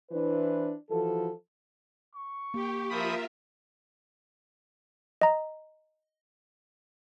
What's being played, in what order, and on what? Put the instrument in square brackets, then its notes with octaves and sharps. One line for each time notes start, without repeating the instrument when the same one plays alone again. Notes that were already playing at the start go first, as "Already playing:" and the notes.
[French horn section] E3 D4 E4 B4 C5
E3 F3 F#4 A4
[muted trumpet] C#6
[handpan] A#3 [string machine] G4
[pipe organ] F3 B5 D#6 [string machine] F4 A#4 E5
[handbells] D#5 A#5